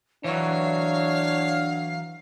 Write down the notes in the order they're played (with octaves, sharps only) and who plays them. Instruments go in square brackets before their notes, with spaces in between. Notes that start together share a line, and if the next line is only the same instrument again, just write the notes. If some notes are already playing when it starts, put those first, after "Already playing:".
[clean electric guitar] E3 F#3 [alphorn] D4 [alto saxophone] C#5 [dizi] F5